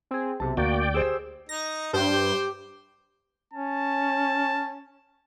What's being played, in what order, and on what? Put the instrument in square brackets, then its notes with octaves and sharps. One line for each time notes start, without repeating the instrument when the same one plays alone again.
[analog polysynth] C4 G#4
[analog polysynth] B1 C3 [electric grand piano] A5
[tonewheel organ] D2 D5 G5 [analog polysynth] A#3 [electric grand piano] F#4
[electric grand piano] G4 G#4 C5 [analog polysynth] E6
[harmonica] D#4 [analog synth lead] A#6
[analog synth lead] G2 [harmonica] C5 G5
[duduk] G4
[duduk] C#4 [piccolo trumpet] A5